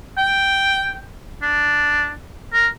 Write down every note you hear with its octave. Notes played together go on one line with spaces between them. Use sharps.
G5
D4
A#4